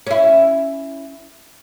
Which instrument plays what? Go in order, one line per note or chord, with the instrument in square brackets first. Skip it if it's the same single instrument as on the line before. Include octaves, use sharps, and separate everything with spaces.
[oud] C#4 E4